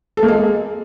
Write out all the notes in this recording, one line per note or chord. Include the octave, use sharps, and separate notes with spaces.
A4
A#3
G#3